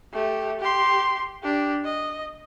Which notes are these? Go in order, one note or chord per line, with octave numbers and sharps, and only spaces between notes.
A3 G4
G4 C6
D4 G4
D#5